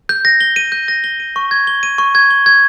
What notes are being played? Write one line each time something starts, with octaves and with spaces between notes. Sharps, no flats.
G6
A#6
G7
D#7
G6
A#6
G7
D#7
C#6
G#6
G7
D#7
C#6
G#6
G7
G#6